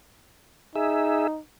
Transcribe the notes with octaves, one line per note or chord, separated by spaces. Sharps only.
D#4 G#4 E5